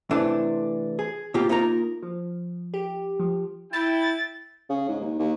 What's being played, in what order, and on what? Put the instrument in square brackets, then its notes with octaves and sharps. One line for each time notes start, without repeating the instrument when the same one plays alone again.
[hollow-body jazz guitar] C3 E3 A3 D4
G#4
B2 A#3 F4 G4
A#3 D#4 F4 A#4 A#5
[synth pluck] F3
G4
F3
[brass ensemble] E4 G5 [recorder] A6
[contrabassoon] C#3
G#2
D#2
D#2